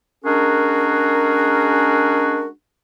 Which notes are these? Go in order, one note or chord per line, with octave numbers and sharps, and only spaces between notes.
G#3 C#4 D4 F#4 G#4 A#4